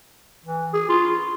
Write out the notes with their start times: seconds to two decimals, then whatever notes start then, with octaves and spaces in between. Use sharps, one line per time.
0.45 E3
0.74 G#4
0.89 F4